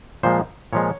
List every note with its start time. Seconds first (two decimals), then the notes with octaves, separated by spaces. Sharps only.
0.23 A#2 F3 G#3 C5
0.73 A#2 F3 G#3 C#5